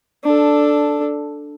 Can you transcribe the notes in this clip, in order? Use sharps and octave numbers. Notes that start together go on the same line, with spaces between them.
D4 A4